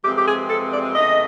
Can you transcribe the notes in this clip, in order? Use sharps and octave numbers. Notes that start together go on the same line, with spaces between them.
F2 C3 E3 G#3 C4 G4
G4
G#4
A4
D5
E2 C#3 E3 A3 D#5